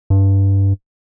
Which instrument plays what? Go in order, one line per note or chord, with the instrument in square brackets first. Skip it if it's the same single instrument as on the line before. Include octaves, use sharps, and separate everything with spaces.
[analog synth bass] G2